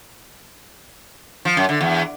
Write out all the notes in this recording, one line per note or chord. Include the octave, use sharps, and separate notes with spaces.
F3
F#2
D3
E2